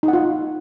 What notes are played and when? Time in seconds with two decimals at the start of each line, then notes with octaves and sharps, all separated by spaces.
0.03 D#4
0.08 F#5
0.13 F4